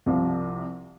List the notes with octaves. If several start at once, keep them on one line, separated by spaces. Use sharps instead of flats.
C2 C3 F3